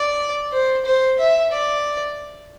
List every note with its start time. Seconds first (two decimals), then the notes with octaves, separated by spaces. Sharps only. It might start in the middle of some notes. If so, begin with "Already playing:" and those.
Already playing: D5
0.52 C5
0.85 C5
1.19 E5
1.52 D5